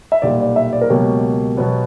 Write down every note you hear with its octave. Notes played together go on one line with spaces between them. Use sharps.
E5
B1 A#2 G3 D5
D5
E5
D5
A#4
C#2 B2 F#3 A#3 G4
B2 F#3 B3